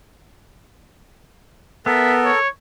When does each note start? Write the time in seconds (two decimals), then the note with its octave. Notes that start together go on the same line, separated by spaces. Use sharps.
1.86 B3 A4 A#4 E5
2.25 C#5